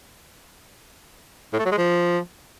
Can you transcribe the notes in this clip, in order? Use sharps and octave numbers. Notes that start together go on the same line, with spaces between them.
A2
A3
F#3
G#3
F3